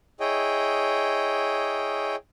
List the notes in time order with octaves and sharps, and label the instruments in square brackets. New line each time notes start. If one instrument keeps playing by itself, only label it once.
[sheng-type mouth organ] E4 G#4 C#5 D#5 G5